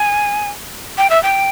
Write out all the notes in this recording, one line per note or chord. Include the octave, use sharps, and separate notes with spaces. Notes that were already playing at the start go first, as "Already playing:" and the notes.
Already playing: G#5
G5
E5
G5